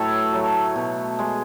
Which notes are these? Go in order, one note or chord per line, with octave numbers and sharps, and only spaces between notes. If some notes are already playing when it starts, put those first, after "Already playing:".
Already playing: A2 F#3 A3 A4 B4 C#5
F#3 A3
B2
G#3